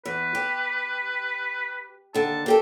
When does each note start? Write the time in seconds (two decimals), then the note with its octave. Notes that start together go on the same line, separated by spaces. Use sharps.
0.06 E2 B4
0.35 G4
2.14 D#2 D3 A5
2.46 A#3 G4 A4